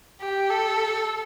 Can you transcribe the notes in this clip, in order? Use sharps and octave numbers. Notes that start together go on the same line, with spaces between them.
G4
A4